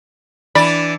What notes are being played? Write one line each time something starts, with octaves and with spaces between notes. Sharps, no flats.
E3 D4 D5 B5